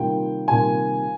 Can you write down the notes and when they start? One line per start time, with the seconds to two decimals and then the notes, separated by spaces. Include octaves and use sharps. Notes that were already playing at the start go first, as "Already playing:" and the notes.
Already playing: C3 D#3 G3 A#3 F4 G5
0.48 C3 D#3 G3 A#3 F4 G#5